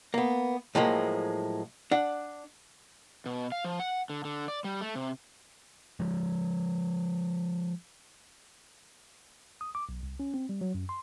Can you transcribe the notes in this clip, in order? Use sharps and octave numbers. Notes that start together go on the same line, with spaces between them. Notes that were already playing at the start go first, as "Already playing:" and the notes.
A#3 B3
A2 F3 F#3 G#3 A#3
D4 F#5
B2
F5
F3
F#5
D3
D3
D5
G3
A3
C3
F3 G#3
D#6
D6
B1
C2
C#4
C4
G3
F#3
F#2
C6